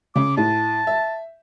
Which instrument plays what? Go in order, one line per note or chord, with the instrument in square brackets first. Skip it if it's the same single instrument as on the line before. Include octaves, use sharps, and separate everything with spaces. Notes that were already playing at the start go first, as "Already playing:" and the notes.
[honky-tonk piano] C#3 [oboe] D6
[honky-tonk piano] A2 [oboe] A5
[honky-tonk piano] E5